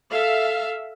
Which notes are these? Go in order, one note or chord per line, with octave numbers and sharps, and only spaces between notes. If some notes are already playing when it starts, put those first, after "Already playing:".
A4 E5 F5